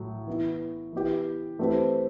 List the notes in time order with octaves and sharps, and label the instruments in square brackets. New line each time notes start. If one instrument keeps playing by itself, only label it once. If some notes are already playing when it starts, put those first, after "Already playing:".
Already playing: [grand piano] A2 F#3
E3 B3 E4
E3 B3 E4 G4
E3 A3 C4 G4 B4